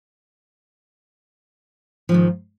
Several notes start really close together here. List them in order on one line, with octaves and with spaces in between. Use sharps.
F3 G#2 D#3